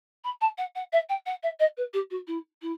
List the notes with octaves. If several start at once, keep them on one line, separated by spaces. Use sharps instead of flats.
B5
A5
F#5
F#5
E5
G5
F#5
E5
D#5
B4
G4
F#4
E4
E4